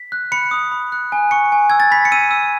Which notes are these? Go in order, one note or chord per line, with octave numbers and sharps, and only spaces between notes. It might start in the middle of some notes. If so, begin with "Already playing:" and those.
Already playing: B6
F#6
B5 C#7
D#6
B5
F#6
G#5
C#6 C#7
G#5
E6 G#6
A6
B5 B6
C#7
E6 D#7
E6